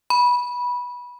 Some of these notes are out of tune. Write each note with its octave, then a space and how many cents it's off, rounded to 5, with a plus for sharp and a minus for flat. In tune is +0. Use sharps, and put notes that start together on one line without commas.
B5 -15